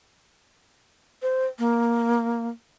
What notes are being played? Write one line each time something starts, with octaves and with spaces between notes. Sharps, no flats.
C5
A#3